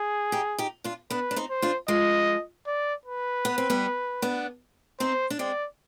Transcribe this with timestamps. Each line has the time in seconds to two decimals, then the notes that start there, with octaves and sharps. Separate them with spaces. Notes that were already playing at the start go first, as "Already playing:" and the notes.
Already playing: G#4
0.32 D#4 G4
0.58 D#4 G4
0.84 D4 F4
1.10 B3 D4 B4
1.31 D4
1.36 C4 D#4
1.50 C5
1.62 D4 F4
1.88 F3 G#3 D#5
2.67 D5
3.05 B4
3.45 B3
3.58 C4
3.70 G3 B3
4.22 B3 D4
5.00 C4 D#4 C5
5.30 D4
5.39 G#3 C4 D5